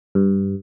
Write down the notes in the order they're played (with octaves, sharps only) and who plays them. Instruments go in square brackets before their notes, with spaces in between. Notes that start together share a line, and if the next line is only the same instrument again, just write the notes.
[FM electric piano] G2